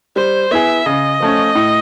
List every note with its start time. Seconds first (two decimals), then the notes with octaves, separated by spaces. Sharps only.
0.16 G3 C5
0.51 B3 E4 G#4 E5
0.86 C#3 D#5
1.20 F3 A3 C#4
1.55 A2